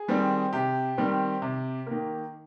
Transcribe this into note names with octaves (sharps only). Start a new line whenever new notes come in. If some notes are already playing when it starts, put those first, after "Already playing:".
Already playing: G#4
D#3 G3 C4
C3 G4
D#3 G3 C4
C3
D#3 A#3